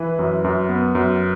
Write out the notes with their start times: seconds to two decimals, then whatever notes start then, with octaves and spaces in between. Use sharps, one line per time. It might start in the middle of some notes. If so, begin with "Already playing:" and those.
Already playing: E3 B4 E5
0.19 F#2
0.44 F#2
0.69 B3
0.95 F#2